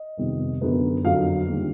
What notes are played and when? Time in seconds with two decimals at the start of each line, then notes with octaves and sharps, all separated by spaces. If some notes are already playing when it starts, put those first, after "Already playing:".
Already playing: D#5
0.17 F2 C3 D#3 G3 B3
0.61 F#2 D3 F#3 B3
1.04 F2 D3 F#3 F5
1.48 D#2 D3 G3